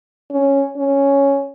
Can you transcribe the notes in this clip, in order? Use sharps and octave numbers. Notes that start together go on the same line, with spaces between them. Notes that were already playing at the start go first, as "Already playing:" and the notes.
C#4
C#4